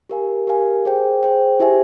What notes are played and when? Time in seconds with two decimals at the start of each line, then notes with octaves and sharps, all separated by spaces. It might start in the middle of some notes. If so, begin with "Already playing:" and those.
0.09 G4 A#4 F5 G#5
0.47 G4 A#4 F5 G#5
0.85 G#4 C5 G5
1.23 G#4 C5 G5
1.60 E4 G4 C5 E5 G#5